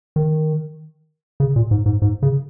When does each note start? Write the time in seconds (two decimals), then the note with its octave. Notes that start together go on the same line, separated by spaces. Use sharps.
0.16 D#3
1.40 C#3
1.56 A#2
1.71 G#2
1.86 G#2
2.02 G#2
2.22 C#3